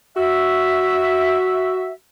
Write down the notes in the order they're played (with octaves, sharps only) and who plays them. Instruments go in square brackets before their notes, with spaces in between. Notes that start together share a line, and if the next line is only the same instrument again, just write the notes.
[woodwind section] F#4 E5